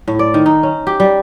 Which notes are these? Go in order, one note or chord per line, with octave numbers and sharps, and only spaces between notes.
A2
D5
D#3
D#4
C#4
G4
G3